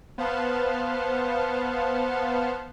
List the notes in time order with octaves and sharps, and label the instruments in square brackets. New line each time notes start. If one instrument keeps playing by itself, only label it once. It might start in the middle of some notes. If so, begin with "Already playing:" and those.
[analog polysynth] B3 C5 F5 F#5 A5